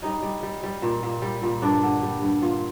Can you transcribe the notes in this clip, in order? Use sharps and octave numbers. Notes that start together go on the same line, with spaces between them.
G3 D#4
G3
G3
G3
A#2
A#2
G3
A#2
G2 D4
D3
G3
G2
A#2 F4